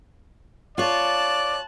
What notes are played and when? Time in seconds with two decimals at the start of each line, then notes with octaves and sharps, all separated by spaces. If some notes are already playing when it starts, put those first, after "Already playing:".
0.78 F4 C#5 D5 A5 F#6